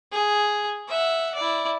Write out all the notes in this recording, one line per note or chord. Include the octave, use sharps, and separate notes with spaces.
G#4
E5 F#5
E4 D5